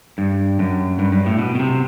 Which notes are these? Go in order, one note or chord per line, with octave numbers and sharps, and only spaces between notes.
G2
F#2
G2
G2
A2
B2
B2
C3